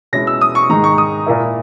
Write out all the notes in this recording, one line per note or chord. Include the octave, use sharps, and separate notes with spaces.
B2 G#3 C#4 E4 A#6
E6
D#6
C#6
G#2 D#3 G#3 D#4 A#5
C#6
D#6
A#2 A#3 E4